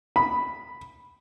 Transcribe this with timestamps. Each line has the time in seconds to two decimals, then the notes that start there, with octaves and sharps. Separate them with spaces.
0.16 B5